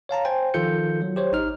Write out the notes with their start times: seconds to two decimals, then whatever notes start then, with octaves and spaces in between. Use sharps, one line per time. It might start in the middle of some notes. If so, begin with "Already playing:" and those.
0.09 C#5 F5 A5 A#5
0.25 C5 G5 G#5
0.54 D#3 F3 F4 A4 G6 C#7
1.02 F#3
1.16 G4 C5 C#5
1.32 A1 D#4 F6